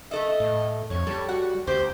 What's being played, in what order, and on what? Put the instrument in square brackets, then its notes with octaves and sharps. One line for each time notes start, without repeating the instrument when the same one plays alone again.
[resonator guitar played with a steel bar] A3 A4 E5 [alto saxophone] D#5
[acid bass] A2
[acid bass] F2 [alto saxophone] C#5
[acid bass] G3 [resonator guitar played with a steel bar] A4
[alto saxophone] F#4 [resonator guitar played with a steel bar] F#5
[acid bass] D2 [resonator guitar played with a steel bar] G4 [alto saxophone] C5